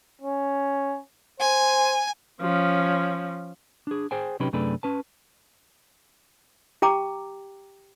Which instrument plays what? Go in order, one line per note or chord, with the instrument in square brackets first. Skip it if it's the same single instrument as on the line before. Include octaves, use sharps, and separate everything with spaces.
[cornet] C#4
[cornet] C5 [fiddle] G#5
[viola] F3 C#4
[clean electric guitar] D4 G#4
G#4 C5 G5 G#5
C3 F#3 C#4 D#4 G4 B4
F#2 C3 A3 D4 G#4 B4
C#4 B4 A5
[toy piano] G4 G5 A#5 D6